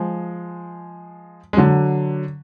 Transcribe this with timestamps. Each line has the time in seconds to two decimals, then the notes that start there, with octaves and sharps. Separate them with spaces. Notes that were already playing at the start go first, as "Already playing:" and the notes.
Already playing: F3 G#3
1.53 G#3
1.57 D3 F#3